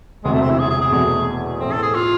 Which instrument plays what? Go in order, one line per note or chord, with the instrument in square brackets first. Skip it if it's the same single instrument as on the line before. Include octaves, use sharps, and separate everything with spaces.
[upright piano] E1 D2 C3 [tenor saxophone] G#3
[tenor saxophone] A3
C4
E4
G#4
G#4
G#4
[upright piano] E2 B2 A3
[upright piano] A2 E3 A3 [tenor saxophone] C4
[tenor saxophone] A4
G#4
F4